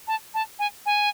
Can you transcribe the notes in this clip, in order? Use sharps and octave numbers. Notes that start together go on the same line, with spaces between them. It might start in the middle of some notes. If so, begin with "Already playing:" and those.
A5
A5
G#5
G#5